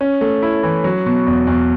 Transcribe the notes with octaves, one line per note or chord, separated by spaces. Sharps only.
C#4
A3
E4
E3
F#3
B2
E2
E2